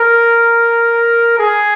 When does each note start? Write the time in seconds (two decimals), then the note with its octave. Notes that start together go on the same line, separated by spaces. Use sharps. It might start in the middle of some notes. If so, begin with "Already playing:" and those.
Already playing: A#4
1.38 G#4